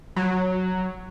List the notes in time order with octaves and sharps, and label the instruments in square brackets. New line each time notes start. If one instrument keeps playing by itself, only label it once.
[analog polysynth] F#3